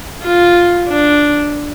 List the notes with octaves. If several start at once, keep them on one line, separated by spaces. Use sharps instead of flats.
F4
D4